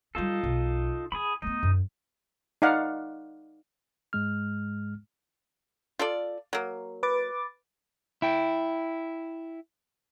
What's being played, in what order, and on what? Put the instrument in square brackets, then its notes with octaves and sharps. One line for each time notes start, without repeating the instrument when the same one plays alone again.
[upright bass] F#3 G3 [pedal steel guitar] D#4 F4 A4
[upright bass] B1
[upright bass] E4 [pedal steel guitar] G#4 B5
[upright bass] A3 B3 [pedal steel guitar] D#4
[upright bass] F#2
[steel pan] D#4 D5 F5 F#5
[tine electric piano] G#2 G#3 F6
[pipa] F4 A4 D5
F#3 A#3
[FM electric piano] B4 D6 A6
[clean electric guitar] E4 G5